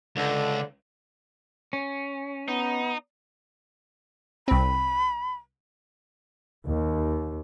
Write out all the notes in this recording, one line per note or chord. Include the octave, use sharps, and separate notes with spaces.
C#2 D3
C#4
B3 D#4
C2 C4 B5
D#2